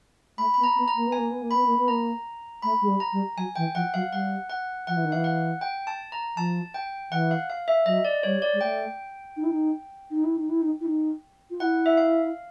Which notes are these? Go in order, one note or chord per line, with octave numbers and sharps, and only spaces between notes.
A3 B5
B3 B5
A#5
B3
A#5
A#3
B3
G#5
A#3
B3
A#3
B3 B5
A#3
B3
A#3 A#5
A3 B5
G#3
G3
A#5
G3
F#3 G#5
E3 G5
F3 F#5
F#3 F5
G3 F#5
F#5
F3 F#5
E3
D#3
E3 F5
F#5
G5
A5
A#5
F3 A5
G5
E3 F#5
F5
F5
E5
F#3 D#5
D5
G3 C#5
D5
G#3
A3 G5
D#4
E4
D#4
D#4
E4
D#4
E4
D#4
E4
D#4
F4
E4 F#5
E5
F5